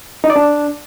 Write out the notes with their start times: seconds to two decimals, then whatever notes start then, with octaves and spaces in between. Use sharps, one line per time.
0.24 D#4
0.30 D5
0.36 D4